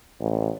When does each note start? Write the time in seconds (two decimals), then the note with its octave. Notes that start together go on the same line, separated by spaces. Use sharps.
0.20 A1